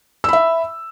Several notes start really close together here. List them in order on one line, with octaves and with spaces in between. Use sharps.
E6 B5 E5